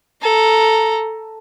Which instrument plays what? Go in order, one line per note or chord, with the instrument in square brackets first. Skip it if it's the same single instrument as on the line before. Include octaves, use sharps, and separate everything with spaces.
[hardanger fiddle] A4 A#5